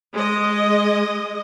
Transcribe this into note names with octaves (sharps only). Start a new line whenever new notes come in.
G#3 D#5